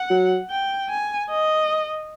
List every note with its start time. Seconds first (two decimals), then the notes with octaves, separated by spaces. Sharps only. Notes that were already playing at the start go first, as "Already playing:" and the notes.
Already playing: F#5
0.10 F#3
0.50 G5
0.89 G#5
1.30 D#5